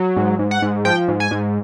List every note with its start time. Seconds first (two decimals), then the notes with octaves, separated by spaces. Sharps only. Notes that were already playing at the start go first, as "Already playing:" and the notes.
Already playing: F#3
0.16 G#2
0.39 G#2
0.51 F#5
0.62 G#2
0.85 F3 G5
1.08 G#2
1.20 G#5
1.31 G#2